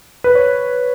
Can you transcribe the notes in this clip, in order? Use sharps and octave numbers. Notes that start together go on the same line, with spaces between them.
B4
C#5